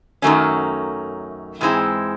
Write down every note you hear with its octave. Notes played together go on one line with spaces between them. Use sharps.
F#2 D#3 F#3 A3 C#4
G#2 E3 G#3 C4 E4